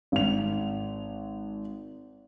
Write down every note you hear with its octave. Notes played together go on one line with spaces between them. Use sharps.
G#1 F7